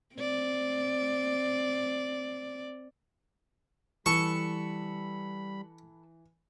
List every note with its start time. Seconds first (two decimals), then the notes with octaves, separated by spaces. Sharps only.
0.16 C4 D5
4.06 E3 G3 A4 B4 B5 C#6